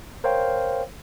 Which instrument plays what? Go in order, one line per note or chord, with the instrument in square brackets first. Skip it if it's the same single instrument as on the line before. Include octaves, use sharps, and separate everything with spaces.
[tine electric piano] A#4 C5 C#5 F5 G5